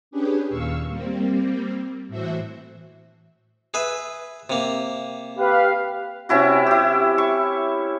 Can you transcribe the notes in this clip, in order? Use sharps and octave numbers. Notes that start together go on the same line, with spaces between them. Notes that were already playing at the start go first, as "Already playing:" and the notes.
C#4 D4 G4 G#4 B4
D#2 A#2 F5 C#6 E6
G3 A#3 C4
A2 E3 F#4 C5 E5
G#4 B4 E5
C3 A#3
G4 B4 F5
C3 C#4 E4 F#4
E4 G4
C#6